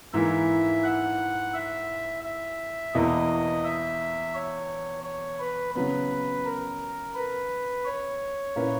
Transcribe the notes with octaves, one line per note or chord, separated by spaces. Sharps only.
G#2 E3 A#3 E4 E5
F#5
E5
E5
E2 B2 A#3 E4 D#5
E5
C#5
C#5
B4
C#3 F#3 B3 B4
A#4
B4
C#5
A#2 A#3 C#4 E4 B4